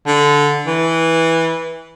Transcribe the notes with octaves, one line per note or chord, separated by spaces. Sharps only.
D3
E3